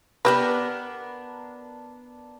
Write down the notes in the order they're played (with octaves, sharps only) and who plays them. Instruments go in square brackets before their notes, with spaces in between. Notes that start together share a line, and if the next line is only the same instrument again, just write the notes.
[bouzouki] B3 D4 A#4 [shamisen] G4 B4